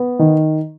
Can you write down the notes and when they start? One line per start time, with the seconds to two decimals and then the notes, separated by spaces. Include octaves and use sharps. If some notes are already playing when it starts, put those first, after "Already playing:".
Already playing: B3
0.19 D#3